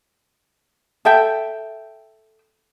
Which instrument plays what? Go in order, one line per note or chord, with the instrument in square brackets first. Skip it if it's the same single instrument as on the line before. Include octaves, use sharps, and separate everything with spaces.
[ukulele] A4 E5 G5